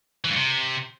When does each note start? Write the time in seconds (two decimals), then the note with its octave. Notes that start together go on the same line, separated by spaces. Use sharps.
0.25 E3
0.30 G2
0.36 C3